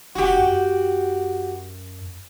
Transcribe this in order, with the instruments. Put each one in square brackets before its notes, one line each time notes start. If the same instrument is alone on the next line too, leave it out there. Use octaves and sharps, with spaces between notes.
[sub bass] F1 [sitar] F#4 G4
[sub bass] F#2